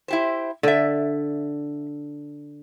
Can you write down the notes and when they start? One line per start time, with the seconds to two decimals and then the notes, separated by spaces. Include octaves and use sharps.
0.08 E4 G4 C5
0.63 D3 D5 E5